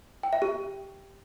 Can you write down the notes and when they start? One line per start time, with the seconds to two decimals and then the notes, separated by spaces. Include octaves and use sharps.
0.23 G5
0.33 E5
0.42 G4